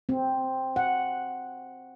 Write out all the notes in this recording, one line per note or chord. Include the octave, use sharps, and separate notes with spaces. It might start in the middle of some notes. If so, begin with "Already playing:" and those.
C4
F#5